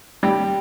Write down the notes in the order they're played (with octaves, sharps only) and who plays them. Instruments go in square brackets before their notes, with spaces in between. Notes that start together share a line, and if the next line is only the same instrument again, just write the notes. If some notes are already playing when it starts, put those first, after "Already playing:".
[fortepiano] G3